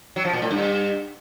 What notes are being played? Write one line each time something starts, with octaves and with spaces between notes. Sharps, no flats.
F#3
F3
A#2
A2
G2